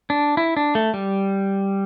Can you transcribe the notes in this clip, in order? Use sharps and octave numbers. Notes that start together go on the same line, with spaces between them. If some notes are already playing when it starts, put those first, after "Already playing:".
D4
E4
D4
A3
G3